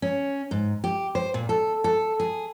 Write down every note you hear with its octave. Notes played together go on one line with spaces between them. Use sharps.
C#4
G#2
G4
C5
A#2
A4
A4
G#4